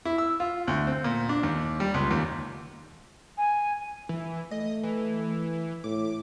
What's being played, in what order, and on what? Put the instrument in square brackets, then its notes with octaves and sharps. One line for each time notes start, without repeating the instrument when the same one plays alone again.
[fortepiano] E4
E6
F4
D2
C4
A#2
D4
D#2
G3
C#2
D#2
[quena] G#5
[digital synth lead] E3
[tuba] A3 [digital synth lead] D#5
[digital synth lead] E3
[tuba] A2 [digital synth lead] D6